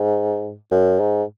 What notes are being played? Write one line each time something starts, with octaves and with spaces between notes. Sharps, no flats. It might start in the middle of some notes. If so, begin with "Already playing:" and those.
Already playing: G#2
F#2
G#2